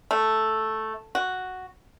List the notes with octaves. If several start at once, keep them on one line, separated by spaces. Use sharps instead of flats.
A3
F#4